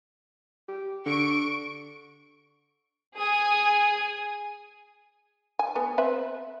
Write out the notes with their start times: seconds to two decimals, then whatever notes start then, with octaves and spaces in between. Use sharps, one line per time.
0.68 G4
1.06 D3 C#6 D7
3.18 G#4 G#5 D#6
5.59 G#5
5.75 A3 B3
5.98 C4 B4 E5